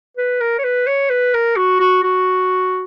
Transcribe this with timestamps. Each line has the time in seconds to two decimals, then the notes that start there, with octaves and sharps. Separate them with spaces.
0.17 B4
0.41 A#4
0.58 C#5
0.64 B4
0.87 C#5
1.10 B4
1.34 A#4
1.56 F#4
1.80 F#4
2.03 F#4